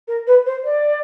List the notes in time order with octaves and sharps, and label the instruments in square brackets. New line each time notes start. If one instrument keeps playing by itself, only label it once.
[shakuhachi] A#4
B4
C5
D5